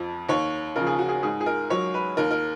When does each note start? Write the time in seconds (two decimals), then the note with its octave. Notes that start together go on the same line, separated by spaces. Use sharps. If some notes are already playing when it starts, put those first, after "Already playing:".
Already playing: F2 F3
0.29 D#2 C#5
0.76 C#3 F3 A#4
0.87 G#4
0.99 F#4
1.09 G#4
1.23 G#2 G#4
1.41 G#4
1.46 A#4
1.70 F#3 C#5
1.94 B4
2.17 D#2 A#4
2.31 A#4